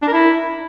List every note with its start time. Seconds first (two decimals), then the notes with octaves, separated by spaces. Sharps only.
0.02 D4
0.07 A#4
0.13 E4